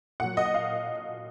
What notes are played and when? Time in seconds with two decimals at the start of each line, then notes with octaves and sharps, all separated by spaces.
0.20 A#2 F#3 F#5
0.37 D#5
0.45 F#5
0.54 F5